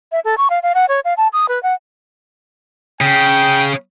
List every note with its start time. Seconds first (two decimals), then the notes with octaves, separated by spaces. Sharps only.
0.12 E5
0.25 A4
0.38 C#6
0.50 F5
0.63 F5
0.75 F#5
0.89 C#5
1.05 F5
1.17 A5
1.33 D#6
1.49 B4
1.63 F#5
3.01 C#3 G5